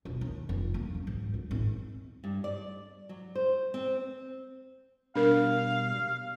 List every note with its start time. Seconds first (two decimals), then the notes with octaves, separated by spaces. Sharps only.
0.05 E1
0.21 D#2
0.49 F1
0.74 A#3
0.94 C#3
1.07 G#2
1.34 D2
1.51 G#1
2.24 G2
2.44 D5
3.09 F#3
3.35 C5
3.74 C4
5.15 B2 G3 D4 A#4 F5